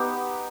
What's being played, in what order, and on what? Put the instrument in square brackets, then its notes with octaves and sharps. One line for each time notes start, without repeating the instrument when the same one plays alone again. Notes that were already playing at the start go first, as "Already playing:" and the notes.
Already playing: [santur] B3 D#4 G4